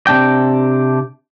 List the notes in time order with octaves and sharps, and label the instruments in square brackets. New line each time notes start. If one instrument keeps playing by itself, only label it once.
[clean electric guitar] C3 D4 G5